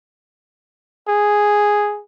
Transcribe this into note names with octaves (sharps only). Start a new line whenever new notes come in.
G#4